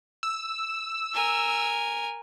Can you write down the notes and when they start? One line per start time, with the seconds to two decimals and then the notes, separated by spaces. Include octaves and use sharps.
0.23 E6
1.14 A#4 G#5